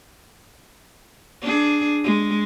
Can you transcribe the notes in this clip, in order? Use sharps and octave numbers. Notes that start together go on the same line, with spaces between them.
D4 G#4
G#3